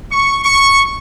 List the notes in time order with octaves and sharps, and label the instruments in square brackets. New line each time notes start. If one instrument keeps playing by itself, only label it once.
[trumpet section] C#6
C#6